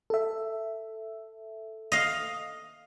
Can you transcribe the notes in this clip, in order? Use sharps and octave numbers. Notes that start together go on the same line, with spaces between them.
A4 E5
D#5 F5